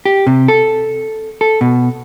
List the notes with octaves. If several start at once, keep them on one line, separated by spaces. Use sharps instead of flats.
G4
C3
A4
A4
B2